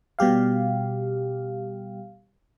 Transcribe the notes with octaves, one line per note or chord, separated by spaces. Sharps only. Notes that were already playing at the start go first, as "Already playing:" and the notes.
B2 G3 G4 F5